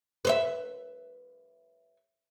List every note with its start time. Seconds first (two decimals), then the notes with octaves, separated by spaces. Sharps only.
0.25 B4 C5 E5